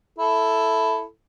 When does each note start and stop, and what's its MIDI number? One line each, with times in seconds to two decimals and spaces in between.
0.19 1.04 64
0.19 1.04 69